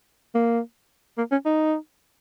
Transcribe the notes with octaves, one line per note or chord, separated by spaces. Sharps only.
A#3
A#3
C#4
D#4